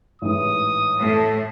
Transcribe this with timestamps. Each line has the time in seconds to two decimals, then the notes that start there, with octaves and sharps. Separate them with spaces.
0.22 A1 G#2 E3 D#6
0.99 A2